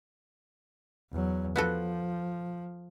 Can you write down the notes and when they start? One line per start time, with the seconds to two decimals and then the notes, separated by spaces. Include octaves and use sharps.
1.11 E2 F#3
1.56 F3 B3 F#4 A4